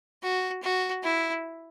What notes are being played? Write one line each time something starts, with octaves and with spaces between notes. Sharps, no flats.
F#4
F#4
E4